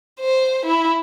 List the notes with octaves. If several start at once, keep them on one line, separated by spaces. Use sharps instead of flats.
C5
E4